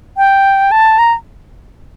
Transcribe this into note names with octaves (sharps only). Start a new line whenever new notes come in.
G5
A5
A#5